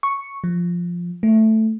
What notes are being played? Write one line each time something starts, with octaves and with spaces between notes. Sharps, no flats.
C#6
F3
A3